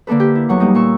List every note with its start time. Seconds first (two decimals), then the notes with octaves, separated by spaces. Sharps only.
0.07 D3 A#3 D4 A4 B4
0.20 G4
0.35 E4
0.49 E2 F#3 F#5 C#6
0.60 G3 A#3 D#4
0.75 A#2 C#6 E6